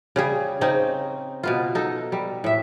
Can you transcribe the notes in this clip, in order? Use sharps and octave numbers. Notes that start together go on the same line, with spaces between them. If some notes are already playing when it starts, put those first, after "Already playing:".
C#3 G3 G#4
C#3 C4 D#4
B2 B3 F4
D#4 A4
G3
A2 E5